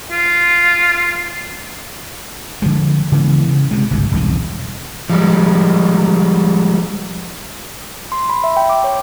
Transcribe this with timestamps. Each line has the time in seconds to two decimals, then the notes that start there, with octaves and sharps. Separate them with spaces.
0.11 F4
2.62 D3 F3 G#3
3.12 C#3 E3 G#3 B3
3.49 C#3
3.71 C3 G#3
3.91 G1 C#2 G#2
4.12 E1 C2 D#3
5.10 F3 G3 G#3
8.12 C6
8.30 B5
8.44 E5
8.57 G5
8.69 D6
8.84 C#5